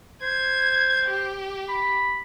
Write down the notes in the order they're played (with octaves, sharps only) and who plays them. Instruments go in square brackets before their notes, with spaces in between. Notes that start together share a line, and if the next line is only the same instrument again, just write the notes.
[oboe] C5 [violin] G#6
[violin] G4
[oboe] B5